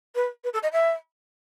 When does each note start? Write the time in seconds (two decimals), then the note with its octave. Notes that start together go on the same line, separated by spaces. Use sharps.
0.15 B4
0.44 B4
0.53 A4
0.63 D#5
0.72 E5